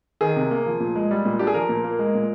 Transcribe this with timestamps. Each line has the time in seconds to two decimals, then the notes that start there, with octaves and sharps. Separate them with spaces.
0.21 D#3 G#4
0.36 C3
0.51 A#3
0.66 F3
0.80 A#2
0.96 G#3
1.11 G3
1.25 A#2
1.39 D4 G4
1.47 G#4
1.54 F3 A#4
1.69 A#2
1.84 A#3
1.99 G#3
2.15 A#2